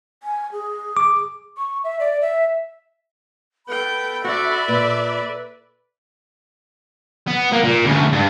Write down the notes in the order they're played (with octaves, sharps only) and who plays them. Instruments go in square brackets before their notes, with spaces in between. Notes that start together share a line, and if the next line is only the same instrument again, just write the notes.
[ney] G#5
G#4
[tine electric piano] D6
[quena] C#6
E5
D5
E5
[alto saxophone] B3 [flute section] A4 B5 [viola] G5
[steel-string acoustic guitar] C4 [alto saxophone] F#4 [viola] D5 E5
[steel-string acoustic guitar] A#2 [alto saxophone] B4
[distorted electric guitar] B3
A#3
A#2
D2 C#3
G2